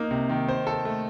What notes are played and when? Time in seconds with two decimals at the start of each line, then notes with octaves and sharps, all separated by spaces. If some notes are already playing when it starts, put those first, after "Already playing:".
Already playing: A#3 D#4
0.11 C3
0.29 D#3
0.48 C5
0.67 A4
0.85 A3